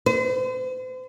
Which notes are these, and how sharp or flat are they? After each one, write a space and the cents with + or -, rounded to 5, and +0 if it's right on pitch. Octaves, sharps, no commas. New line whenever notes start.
C5 -40